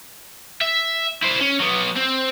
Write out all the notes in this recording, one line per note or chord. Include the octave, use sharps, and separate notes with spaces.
E5
E4 C5
C#4
F#3 B3
C4